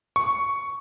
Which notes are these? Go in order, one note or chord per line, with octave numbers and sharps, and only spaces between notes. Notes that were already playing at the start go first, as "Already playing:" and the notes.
C#6